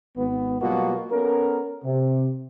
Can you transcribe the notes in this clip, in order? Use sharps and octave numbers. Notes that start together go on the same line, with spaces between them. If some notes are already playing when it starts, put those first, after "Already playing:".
G#1 B3
B2 F#3 G3 A#3 F4 F#4
B3 C#4 A4 A#4
C3